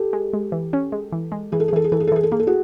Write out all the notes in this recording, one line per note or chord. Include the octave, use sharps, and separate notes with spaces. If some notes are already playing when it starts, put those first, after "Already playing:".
Already playing: G4 A4
G#3
G#3
E3
C#4
G#3
E3
G#3
E3 G#4
A4
G#4
E3 A4
G#4
E3 A4
G#4
A4
E3 G#4
A4
A#3 G#4
A4
F#4 G#4